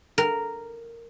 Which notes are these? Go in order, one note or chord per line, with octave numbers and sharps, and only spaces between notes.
A#4